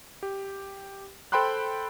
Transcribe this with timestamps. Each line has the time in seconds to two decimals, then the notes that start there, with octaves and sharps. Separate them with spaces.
0.23 G4
1.32 A4 C5 G5 B5 C6 F#6